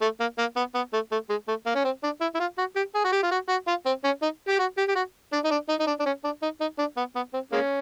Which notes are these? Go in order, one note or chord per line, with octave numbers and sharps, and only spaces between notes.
A3
A#3
A#3
B3
B3
A3
A3
G#3
A3
A#3
C#4
C4
D4
E4
E4
F4
F#4
G4
G#4
F#4
G4
F4
F#4
F#4
F4
C4
C#4
D#4
G4
F#4
G4
G4
F#4
D4
D#4
D4
D#4
D#4
D4
D4
C#4
D4
D#4
D#4
D4
B3
B3
C4
G#3 A#3 C#4